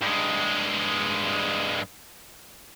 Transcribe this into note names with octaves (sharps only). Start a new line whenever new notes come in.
G2 G#3